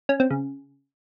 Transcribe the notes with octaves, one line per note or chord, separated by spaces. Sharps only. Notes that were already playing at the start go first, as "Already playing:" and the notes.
C#4
C4
C#3